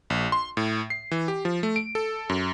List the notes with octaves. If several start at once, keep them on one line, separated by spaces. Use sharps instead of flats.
A#1
C6
A2
C7
E3
G4
F3
A3
D7
A4
F#2